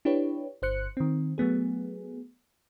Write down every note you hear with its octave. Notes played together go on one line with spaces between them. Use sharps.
D4 E4 G4 B4 C#5
G1 C5 F#6 C#7
D#3 C4
F#3 A3 B3 G#4